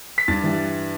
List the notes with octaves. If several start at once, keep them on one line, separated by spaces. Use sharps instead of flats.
B6
G2 A6
E3 G3